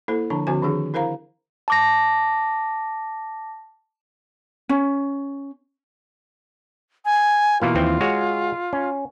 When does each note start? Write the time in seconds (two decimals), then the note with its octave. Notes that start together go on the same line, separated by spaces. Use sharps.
0.08 A#3 E4 A4 C5
0.30 D3 F3 D4 A5
0.47 D3 F3 C4 F#4 C5 G#5
0.62 D#3 F3 D4 G4 G#4
0.94 E4 A#4 C5 F5 A#5
1.68 A5 D6 A#6
4.69 C#4
7.05 G#5
7.62 B2 E3 A#3 F4
7.75 D#2 E3 C4
8.01 G#3 F#4 C#5
8.73 C#4